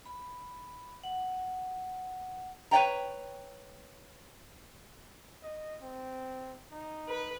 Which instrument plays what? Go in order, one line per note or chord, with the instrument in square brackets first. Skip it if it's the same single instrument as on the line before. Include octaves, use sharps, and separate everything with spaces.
[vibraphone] B5
F#5
[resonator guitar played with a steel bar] B4 C#5 D5 G5 A#5
[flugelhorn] D#5
C4
D#4
[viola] B4